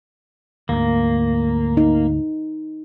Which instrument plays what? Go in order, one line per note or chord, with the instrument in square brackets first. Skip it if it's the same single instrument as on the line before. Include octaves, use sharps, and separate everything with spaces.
[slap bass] D2 G#2 D3 [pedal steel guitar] A#3
[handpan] D#4